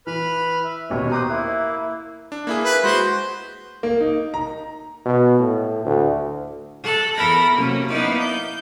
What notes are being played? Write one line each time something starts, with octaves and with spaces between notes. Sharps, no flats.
E3 B4 B5 F6
E5
A1 D#2 B2 C#5
C5 A#5 D6 D#6 F#6
A#3 E4 E5
D4
A#3 E4 G#4
B4
G#3 F#4 B4 C5
A#3
D#4
A#5
B2
A2
D2
A4 F#6
E2 A4 A#4 B5 A#6
C3 F#3 A#3 C#4
A#3 B3 D#4 E4 D5
G6